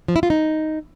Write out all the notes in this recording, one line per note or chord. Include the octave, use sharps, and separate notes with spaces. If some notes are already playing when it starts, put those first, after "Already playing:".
F3
E4
F4
D#4